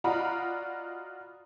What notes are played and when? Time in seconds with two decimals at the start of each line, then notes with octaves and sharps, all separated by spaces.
0.04 F4 F#4 D5 D#5 A#5 B5